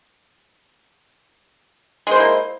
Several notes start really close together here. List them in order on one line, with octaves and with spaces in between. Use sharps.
G#3 C5 E4 A#3